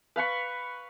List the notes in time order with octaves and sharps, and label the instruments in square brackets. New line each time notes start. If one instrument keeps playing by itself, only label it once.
[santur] B4 F5 B5 C#6